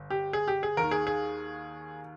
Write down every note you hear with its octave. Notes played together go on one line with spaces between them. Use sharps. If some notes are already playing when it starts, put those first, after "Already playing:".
Already playing: G1
G4
G#4
G4
G#4
D#2 D#3 A#4
G#4
G#4